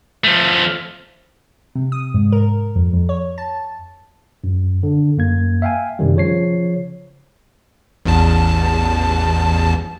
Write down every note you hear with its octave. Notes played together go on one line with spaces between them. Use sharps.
F3 A3
C3
D#6
G#2
A#4
F2
F2
C#5
A5
F#2
D3
F#2 A#3 G#6
E5 F5 G5 G#5
F#2 C3 D#3 G3
C#3 F3 C#5 C7
A1 E2 A5